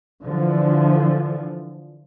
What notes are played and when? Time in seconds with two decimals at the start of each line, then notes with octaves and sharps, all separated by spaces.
0.21 D3 E3 F3